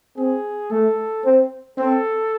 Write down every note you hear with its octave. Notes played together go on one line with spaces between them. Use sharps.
C4 G#4
A3 A4
C4
C4 A4